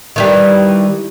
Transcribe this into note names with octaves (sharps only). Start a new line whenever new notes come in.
D#3 E3 G3